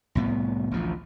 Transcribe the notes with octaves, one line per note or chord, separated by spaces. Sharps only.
C2 A2 B3
A1 D2 F3